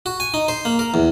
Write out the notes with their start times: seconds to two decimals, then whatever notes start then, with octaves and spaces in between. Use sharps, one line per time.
0.06 F#4
0.20 G#5
0.34 D#4
0.48 C5
0.65 A#3
0.79 A#4
0.94 E2